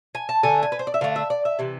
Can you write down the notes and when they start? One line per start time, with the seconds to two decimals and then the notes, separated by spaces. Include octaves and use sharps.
0.15 G#5
0.29 A5
0.43 D3 A3 G#5
0.63 G#5
0.72 B4
0.79 C5
0.87 D5
0.94 E5
1.01 D3 A3 F5
1.16 E5
1.30 D5
1.45 E5
1.59 C3 E3